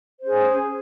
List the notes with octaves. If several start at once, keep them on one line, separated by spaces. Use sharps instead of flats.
C#4 G#4 C5